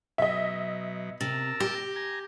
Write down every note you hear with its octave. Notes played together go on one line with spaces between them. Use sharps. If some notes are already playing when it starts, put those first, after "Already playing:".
B2 F#3 D#5 E5
C3 A#4 A5 E6
G4 A#6
G#5 A#5